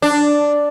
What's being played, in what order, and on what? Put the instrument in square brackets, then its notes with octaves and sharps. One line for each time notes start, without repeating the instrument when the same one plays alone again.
[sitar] D4